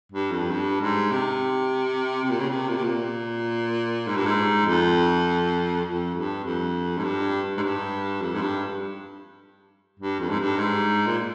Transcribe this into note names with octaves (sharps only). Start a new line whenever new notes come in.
G2
F2
G2
G#2
C3
C3
A#2
C#3
C3
A#2
C3
A#2
G#2
G2
G#2
F2
F2
G2
F2
G#2
G2
G#2
G2
F2
G#2
G2
G2
F2
G#2
G2
G#2
A#2